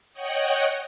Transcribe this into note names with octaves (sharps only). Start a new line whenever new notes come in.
C#5 D#5 F#5 G5 F#6